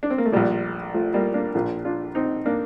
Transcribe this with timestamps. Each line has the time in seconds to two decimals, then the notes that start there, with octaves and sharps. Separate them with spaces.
0.03 D4
0.10 C4
0.18 A#3
0.25 A3
0.32 A#1 A#2 G3
0.94 F3 A3
1.14 G3 A#3
1.34 A#3 D4
1.54 A#1 A#2 D4 F4
1.85 D4 F4
2.15 C4 D#4
2.46 A#3 D4